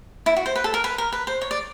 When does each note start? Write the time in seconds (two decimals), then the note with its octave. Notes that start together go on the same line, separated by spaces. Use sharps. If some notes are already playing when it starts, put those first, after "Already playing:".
0.26 E4
0.36 F#4
0.46 C5
0.56 B4
0.64 A4
0.74 A#4
0.84 B4
0.98 A#4
1.12 B4
1.27 C5
1.41 C#5
1.51 D5